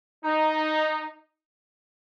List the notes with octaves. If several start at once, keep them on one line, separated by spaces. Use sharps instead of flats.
D#4